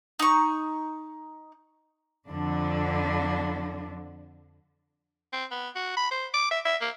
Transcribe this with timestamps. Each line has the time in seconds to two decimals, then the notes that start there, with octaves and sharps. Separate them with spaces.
0.19 D#4 C#6
2.29 F2 D3 D4
5.33 C4
5.51 B3
5.76 F#4
5.97 B5
6.11 C5
6.34 D6
6.51 E5
6.65 E5
6.81 A#3